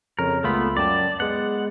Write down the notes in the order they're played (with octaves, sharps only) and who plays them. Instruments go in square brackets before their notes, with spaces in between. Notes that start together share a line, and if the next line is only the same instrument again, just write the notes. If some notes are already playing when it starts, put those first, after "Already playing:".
[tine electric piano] F2 C#3 C#5 [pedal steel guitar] A#4
[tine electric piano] C#2 F4 B5 [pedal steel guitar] A3 B3
[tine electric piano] F#2 G5 A5 [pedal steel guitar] D5
[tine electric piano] G#3 B3 [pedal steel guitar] F#5